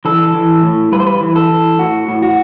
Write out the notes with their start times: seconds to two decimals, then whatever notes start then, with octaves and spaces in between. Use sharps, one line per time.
0.05 E3 A4
0.34 E3
0.63 A2
0.92 G3 B4
1.00 C5
1.07 B4
1.21 E3
1.36 A4
1.50 E3
1.78 A2 F#4
2.08 A2
2.22 F#4